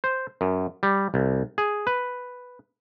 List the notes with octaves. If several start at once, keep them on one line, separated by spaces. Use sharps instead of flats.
C5
F#2
G3
C2
G#4
B4